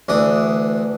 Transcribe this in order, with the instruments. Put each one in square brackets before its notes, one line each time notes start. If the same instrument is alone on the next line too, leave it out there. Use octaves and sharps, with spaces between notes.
[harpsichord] D2 E3 D4 D#6